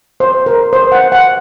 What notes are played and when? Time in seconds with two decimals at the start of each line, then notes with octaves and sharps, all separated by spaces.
0.20 C5
0.46 A#4
0.73 C5
0.92 F#5
1.12 F#5